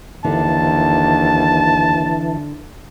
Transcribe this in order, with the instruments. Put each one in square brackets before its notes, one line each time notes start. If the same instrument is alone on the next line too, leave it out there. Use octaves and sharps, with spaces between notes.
[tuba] D#2 [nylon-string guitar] D3 [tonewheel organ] E3 [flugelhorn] A5